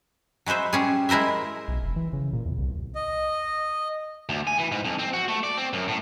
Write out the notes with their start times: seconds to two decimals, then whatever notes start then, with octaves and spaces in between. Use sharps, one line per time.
0.46 F#3 G#3 B4 C5 E5
0.73 G3 C#4 G#4
1.09 G#3 E4 A#4 C5 E5
1.68 B1
1.83 F1
1.96 E3
2.13 C#3
2.33 A#2
2.46 E2
2.59 C2
2.95 D#5
4.29 D2
4.47 G#5
4.59 E3
4.72 G#2
4.85 F2
4.99 C4
5.13 F#4
5.28 A3
5.43 D5
5.57 C4
5.73 F#2
5.88 A2